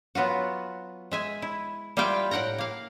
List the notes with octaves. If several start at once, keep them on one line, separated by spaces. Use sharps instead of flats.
F#3 B3 F4 F#4
G#3 E5 G#5
E4
G3 E4 F4 E5 F5 G5
A2 A#4 F#5 G5 A#5
A#3 F5